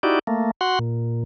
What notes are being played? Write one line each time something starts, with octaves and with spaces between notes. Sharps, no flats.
D#4 E4 F#4 G4 D5
A3 A#3
F#4 F#5 C6
A#2